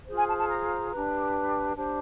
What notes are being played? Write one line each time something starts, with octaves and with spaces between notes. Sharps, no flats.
F4 G#4 C5
G#5
A5
A5
A#5
D4 G4 B4
D4 G4 C5